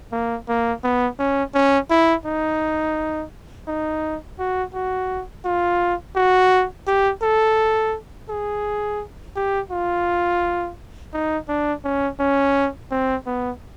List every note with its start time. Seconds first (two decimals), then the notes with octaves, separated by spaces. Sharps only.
0.12 A#3
0.48 A#3
0.84 B3
1.19 C#4
1.54 C#4
1.90 E4
2.25 D#4
3.67 D#4
4.39 F#4
4.74 F#4
5.45 F4
6.16 F#4
6.87 G4
7.23 A4
8.29 G#4
9.36 G4
9.71 F4
11.13 D#4
11.48 D4
11.84 C#4
12.20 C#4
12.91 C4
13.26 B3